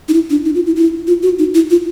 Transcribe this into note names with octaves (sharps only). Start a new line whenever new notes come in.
D#4
E4
D4
D#4
F4
E4
E4
F4
F#4
D#4
E4
F4